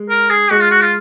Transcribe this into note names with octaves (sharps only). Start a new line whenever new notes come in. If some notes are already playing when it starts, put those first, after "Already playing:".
Already playing: G#3
A#4
G#4
G#3 F#4
F4
F#4
F4